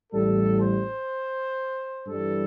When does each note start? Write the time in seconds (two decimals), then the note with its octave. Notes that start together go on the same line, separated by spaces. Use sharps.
0.13 A1 A2 G3 A4
0.61 C5
2.07 G2 E3 G3 A4